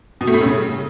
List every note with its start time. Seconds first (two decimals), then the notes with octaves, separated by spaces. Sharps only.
0.21 B2
0.27 A3
0.34 A2
0.41 C#3